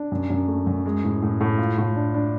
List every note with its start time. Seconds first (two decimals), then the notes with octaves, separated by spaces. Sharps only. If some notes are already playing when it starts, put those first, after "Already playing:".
Already playing: D4
0.12 F#2
0.30 F#2
0.48 A3
0.67 F#2
0.86 G#3
1.04 A2
1.22 A2
1.41 A2
1.59 F4
1.78 A2
1.96 D4
2.14 D4